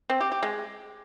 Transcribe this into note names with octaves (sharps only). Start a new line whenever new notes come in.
C4
G4
G4
G#3